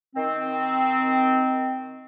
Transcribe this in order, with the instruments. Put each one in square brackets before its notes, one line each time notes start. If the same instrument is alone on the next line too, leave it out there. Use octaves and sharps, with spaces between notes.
[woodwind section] D#3 C4